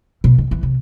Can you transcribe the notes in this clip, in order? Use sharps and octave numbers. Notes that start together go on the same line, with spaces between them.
B2
D#3
E3
C3